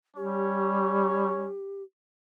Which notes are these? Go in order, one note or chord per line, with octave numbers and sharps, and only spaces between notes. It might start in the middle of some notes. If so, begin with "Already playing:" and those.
G3 C#4 G4 C#5